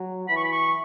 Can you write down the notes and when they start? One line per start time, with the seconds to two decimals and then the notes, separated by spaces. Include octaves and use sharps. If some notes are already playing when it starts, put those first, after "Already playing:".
Already playing: F#3
0.28 E3 B5
0.37 C#6
0.44 B5
0.52 C#6